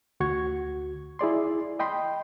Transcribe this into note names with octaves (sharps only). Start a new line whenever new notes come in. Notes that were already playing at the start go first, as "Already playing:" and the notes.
D2 F#4 C#6 G#6
E4 G#4 D5 C6
D#5 G5 B5 C6